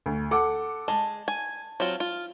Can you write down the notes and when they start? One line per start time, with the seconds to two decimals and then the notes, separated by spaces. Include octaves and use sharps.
0.06 D2
0.31 A4 F#5 D6
0.88 G#3 A5
1.28 G#5
1.80 F#3 C4 F4
2.00 F4